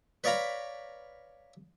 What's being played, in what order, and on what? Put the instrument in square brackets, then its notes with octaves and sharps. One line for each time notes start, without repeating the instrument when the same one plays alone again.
[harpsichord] B4 C#5 D5 F5 A#5 B5